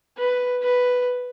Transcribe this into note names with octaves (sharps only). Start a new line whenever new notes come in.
B4
B4